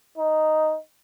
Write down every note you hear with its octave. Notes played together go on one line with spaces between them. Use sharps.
D#4